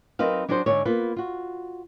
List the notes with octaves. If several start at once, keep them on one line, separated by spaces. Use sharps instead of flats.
F#3 C4 D#4 A#4 B4 F5
F#3 D4 F#4 G#4 B4 C5
G#2 D3 D4 C#5
A#3 B3 F4 B4
F4 F#4